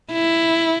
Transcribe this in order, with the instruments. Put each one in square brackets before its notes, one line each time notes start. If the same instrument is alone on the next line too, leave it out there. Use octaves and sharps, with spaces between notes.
[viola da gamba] E4